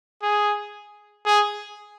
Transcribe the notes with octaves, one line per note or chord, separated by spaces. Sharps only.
G#4
G#4